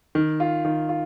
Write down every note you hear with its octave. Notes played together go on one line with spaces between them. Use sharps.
D#3
F4
D#3
F4